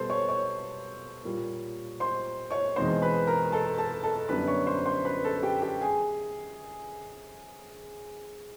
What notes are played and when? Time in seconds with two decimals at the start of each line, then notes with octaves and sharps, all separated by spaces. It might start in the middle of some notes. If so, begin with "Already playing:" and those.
Already playing: B2 G3 B3 A4 C5 A5 C6
0.10 C#5 C#6
0.29 C#5 C#6
1.24 A#2 G3 A#3
2.00 C5 C6
2.51 C#5 C#6
2.76 E2 B2 G#3 C4 D#4 C5 C6
3.02 B4 B5
3.27 A#4 A#5
3.52 A4 A5
3.78 A4 A5
4.03 A4 A5
4.29 F#2 D3 G3 B3 D4 B4 B5
4.47 C#5 C#6
4.67 C5 C6
4.85 C5 C6
5.05 B4 B5
5.24 A4 A5
5.43 G4 G5
5.62 G4 G5
5.81 G#4 G#5